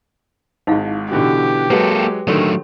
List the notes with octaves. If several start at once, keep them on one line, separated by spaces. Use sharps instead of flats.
G#1 G#2 D#4 E4 F5
B2 D3 E3 G4
F#3 G#3 A#3 A4 B4 F#5
D3 D#3 F#3 A3 A4 C#5 C6